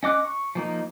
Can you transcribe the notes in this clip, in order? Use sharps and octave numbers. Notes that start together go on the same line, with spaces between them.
C#4 D#5 D6 F#6
C#6
F3 A#3 D#4